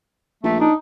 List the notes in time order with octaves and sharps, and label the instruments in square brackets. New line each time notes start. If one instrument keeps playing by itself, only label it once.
[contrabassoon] A#1 [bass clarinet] A3
[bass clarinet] D4 [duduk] D#4